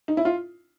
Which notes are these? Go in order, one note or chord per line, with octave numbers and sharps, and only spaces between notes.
D#4
E4
F4